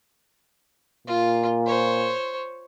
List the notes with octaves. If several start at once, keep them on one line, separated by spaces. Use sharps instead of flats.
A#2 F4
C5 C#5